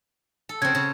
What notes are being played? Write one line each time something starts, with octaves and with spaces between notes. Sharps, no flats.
A4
C#3 C4 G#6
C#3